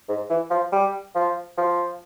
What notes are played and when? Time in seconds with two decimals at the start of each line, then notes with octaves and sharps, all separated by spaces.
0.09 G#2
0.30 E3
0.51 F3
0.72 G3
1.15 F3
1.58 F3